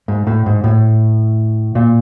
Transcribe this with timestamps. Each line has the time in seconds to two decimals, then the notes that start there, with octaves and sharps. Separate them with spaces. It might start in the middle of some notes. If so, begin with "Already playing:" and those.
0.08 G#2
0.27 A2
0.46 G#2
0.64 A2
1.75 A#2